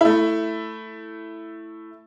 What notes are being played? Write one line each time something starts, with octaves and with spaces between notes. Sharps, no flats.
A3 E4